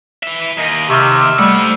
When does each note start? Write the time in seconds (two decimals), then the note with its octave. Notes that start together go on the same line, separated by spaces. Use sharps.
0.23 E3 E5
0.58 D#2 D#5
0.90 C3 C#6 D6 E6 F6
1.39 G3 A3 C5 F#5